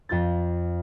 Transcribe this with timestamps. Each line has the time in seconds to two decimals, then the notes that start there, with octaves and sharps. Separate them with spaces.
0.09 F2 F4 G6 A6